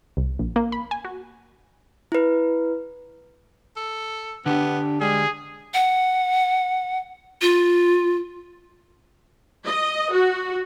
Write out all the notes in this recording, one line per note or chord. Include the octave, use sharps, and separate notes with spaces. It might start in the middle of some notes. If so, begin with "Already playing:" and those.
C2
A#1
A#3
B5
G#5
F#4
E4 B4
A4
D3 B3 D4 G4
G3 G#3 G#4
F#5
F4
D#5
F#4